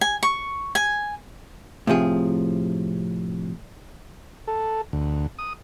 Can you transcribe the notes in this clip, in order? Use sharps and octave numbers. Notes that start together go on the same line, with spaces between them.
G#5
C#6
G#5
A2 C3 F3 G#4
A4
D2
D#6